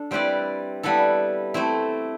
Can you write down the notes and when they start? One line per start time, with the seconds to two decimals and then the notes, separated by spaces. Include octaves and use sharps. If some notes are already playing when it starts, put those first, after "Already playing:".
Already playing: D4 A4
0.11 G3 C4 E4 B4 D5
0.83 G3 B3 E4 A4
1.54 A3 C4 E4